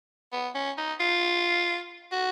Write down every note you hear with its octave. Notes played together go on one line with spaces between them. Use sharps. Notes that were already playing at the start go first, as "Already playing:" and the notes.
B3
C#4
D#4
F4
F#4